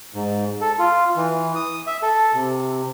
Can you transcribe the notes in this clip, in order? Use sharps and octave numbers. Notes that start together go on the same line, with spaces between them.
G#2
A4
F4
E3
D#6
E5
A4
C3